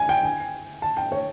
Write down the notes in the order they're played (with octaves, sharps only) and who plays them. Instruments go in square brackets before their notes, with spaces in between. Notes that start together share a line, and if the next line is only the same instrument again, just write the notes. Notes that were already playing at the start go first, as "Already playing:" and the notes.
Already playing: [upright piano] G#5
G5
G#5
A5
G5
C#5